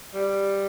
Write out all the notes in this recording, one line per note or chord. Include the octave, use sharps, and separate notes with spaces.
G3